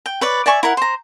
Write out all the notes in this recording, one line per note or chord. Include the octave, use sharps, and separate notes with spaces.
G5
B4 C#5 D5
D5 E5 G#5 C#6
E4 A#4 F#5
C5 A#5